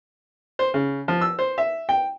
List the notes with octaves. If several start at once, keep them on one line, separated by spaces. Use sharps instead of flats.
C5
C#3
F3
E6
C5
E5
G5